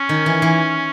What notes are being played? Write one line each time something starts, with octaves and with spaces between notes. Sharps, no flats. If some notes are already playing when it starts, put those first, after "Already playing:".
Already playing: C#4
D#3
E3
E3